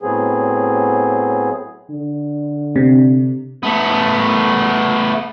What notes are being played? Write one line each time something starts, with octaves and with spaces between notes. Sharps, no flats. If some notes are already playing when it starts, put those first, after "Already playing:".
A2 F#3 B3 C4 G#4
D3
C3
A3 B3